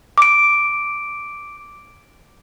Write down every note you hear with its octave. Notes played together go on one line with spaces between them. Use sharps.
D6 D7